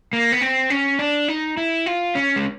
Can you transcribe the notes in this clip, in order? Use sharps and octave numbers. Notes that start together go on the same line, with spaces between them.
A#3
B3
C4
C#4
D4
D#4
E4
F4
C#4
G#3